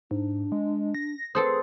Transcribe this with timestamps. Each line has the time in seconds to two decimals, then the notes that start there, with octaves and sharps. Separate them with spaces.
0.11 G#2 D4
0.52 G#3
0.94 A#6
1.35 C4 G#4 A4 B4 C5